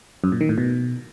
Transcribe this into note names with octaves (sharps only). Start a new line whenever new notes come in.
F#2
A#2
D#3
A2
B2